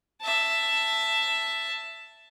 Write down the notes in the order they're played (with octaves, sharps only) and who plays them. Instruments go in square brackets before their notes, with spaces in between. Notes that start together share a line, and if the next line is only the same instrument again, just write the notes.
[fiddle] E5 A5